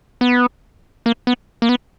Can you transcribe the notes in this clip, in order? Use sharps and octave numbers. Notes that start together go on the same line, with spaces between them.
B3
A#3
B3
A#3
B3